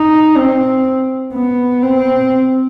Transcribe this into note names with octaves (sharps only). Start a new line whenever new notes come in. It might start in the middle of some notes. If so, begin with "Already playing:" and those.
Already playing: D#4
C4
B3
C4